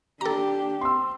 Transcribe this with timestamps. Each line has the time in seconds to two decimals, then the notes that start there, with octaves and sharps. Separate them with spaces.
0.21 D4 G4 A4 A#5
0.81 C4 C6 E6